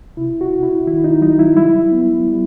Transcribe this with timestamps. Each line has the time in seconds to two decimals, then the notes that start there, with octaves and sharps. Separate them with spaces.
0.17 C3 E4
0.41 F#4
0.51 C3
0.63 E4
0.87 D#3 E4
1.04 D#4
1.21 F#3 D#4
1.39 E4
1.57 G3 E4
1.91 B3
2.26 G3